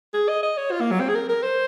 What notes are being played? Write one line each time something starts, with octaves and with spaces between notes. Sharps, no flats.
G#4
D#5
D#5
C#5
F4
A#3
F#3
C4
G#4
A#4
A#4
C5